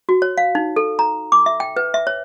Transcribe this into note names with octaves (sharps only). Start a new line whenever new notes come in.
F#4
C#5
F5
D#4
A4
A#5
D6
E5
G5
B4
E5
C#5